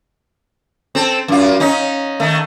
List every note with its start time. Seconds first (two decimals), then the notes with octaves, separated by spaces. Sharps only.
0.95 C4 A4
1.28 F#2 F4
1.60 C#4 D#4
2.20 D#3 A3